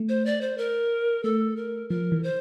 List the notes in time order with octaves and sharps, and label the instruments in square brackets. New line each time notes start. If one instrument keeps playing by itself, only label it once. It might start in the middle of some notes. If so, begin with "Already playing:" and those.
Already playing: [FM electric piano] A3
[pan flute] C5
D5
C5
A#4
[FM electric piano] A3 [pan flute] A4
[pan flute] A#4
[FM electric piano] F3 [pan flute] A#4
[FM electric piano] E3
[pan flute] C5